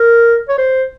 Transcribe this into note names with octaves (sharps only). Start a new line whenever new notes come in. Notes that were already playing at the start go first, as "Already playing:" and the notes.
Already playing: A#4
C#5
C5